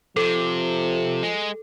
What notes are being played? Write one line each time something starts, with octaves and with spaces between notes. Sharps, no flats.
C3 F3 A4
G#3